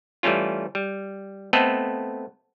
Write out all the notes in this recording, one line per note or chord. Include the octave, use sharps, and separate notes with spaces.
E3 G3 A3 C#4 F4
G3
A3 B3 C4 A4 D#5